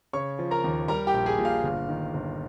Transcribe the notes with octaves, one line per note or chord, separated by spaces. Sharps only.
C#3 C#5 C#6
F3
A#4 A#5
D#2
G3 A#4 A#5
G4 G5
A#1
G#4 G#5
A#2
F5
G1
D#3
G1